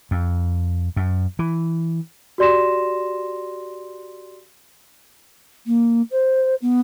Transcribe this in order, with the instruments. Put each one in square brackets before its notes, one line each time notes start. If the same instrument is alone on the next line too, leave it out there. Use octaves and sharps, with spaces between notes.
[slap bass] F2
F#2
E3
[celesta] F#4 G4 D5 C6 A#6 E7
[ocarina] A#3
C5
B3